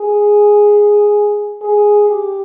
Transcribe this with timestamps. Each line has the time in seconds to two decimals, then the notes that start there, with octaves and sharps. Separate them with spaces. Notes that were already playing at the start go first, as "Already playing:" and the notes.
Already playing: G#4
1.61 G#4
2.09 G4